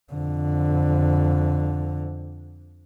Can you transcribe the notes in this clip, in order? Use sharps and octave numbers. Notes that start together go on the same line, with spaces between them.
F2 D3